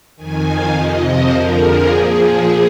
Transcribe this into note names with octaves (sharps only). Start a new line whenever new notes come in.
F2 D#3 G#5
F5
F2 C3 F3 D#5
C5
F2 D3 F3 A#4
G#4
A#2 F3 G#4
G#4